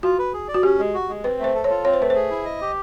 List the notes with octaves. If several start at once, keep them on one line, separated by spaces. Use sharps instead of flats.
F4 F#4
B4
G#4
D5
F#4
C#4 G4
G#3
F#4
G#3
C4 B4
A3 C5
A4
C#5
F4
C4 C#5
C5
A3 B4
C5
G#4
E4
D#5
G4